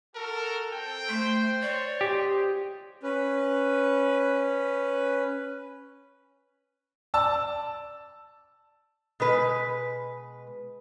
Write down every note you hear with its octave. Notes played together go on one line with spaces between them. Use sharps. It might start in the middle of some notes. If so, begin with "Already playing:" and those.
F#4 A4 A#4
C4 A4 G5
A3 C5
C#5 D5
G#3 G4 C5 D#5
C#4 B4
D5 A5 E6
B2 G#3 B4